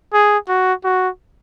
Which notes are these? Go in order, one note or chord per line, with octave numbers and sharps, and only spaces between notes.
G#4
F#4
F#4